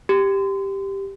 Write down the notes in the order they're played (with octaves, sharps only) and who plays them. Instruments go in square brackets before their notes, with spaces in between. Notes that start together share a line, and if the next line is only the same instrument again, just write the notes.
[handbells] G4